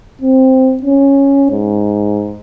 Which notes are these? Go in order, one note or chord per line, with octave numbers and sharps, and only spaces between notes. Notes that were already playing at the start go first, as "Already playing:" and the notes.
C4
C#4
G#2